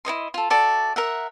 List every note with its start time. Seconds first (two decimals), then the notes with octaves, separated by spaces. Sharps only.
0.05 E4 C#5 D#5 C6
0.34 F4 A4
0.50 F#4 A4 D5 E5
0.96 A#4 E5 F#5